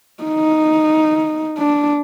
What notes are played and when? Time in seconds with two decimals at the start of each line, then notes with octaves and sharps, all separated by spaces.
0.23 D#4
1.58 D4